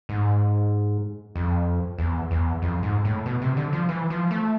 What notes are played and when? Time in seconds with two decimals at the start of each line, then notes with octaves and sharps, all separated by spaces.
0.09 G#2
1.35 F2
1.98 E2
2.31 E2
2.62 F2
2.83 G#2
3.05 A2
3.26 B2
3.42 C3
3.57 D3
3.73 F3
3.89 E3
4.10 F3
4.31 A3